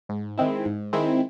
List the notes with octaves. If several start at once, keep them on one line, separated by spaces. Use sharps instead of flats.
G#2
D#3 G#3 C4 E4
G#2
D#3 G#3 C4 E4